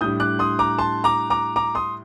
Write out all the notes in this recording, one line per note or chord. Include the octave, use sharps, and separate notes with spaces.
A2 G3 D4 D#6 G6
D6 F#6
C6 D#6
A#5 D6
A5 C6
A#5 D6
A#5 D6
A#5 D6
C6 D#6